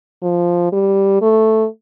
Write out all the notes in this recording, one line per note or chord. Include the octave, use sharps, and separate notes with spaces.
F3
G3
A3